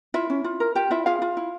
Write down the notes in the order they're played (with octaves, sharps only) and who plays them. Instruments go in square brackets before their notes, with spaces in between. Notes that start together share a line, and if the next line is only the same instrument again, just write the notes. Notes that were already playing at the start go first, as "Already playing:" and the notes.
[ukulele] E4 F4 E5
C#4
F4
A#4
F4 G4 G5
E4 F4 E5
F4 G#4 F5
F4
E4